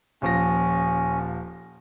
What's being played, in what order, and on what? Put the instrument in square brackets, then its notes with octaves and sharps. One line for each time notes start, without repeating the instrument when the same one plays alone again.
[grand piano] D#1 F3 A#6 [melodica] C#4